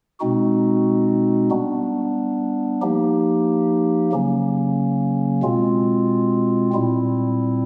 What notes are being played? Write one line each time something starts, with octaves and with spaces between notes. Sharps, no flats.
B2 G#3 C4 D#4 F#4
G3 B3 D4
F3 A#3 D#4 G4
C#3 F#3 A#3 C#4
B2 G#3 C4 F4
A#2 G3 C4 E4